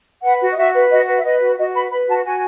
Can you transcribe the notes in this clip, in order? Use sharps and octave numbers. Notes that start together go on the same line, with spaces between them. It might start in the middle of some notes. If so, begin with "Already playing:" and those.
B4 F#5
F#4
D#5
F#4 E5
B4
F#4 D#5
B4
E5
B4 D#5
F#4
F#4 D#5
B4 B5
B4 B5
F#4 A5
F#4 G#5